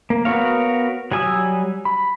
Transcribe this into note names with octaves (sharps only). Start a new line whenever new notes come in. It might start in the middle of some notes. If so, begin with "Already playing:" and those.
A#3
B3 F#4 A#4 C#5 F5
F#3 G3 G#5 D#6 E6
B5